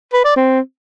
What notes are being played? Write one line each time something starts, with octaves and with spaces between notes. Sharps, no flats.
B4
D5
C4